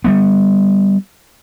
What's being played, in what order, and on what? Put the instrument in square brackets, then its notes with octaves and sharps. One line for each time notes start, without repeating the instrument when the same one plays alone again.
[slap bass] G3 G#3 B3